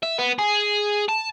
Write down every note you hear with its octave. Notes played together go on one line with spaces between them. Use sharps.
E5
B3
G#4
A5